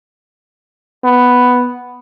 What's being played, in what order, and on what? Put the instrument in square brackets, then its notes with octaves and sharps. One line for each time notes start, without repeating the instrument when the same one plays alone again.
[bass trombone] B3